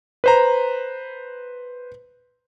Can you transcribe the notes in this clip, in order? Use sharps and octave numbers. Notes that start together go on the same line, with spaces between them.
B4 C5 A#5